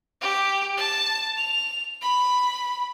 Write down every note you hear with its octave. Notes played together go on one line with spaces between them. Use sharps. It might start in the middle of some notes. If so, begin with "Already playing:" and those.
G4
A5
F7
B5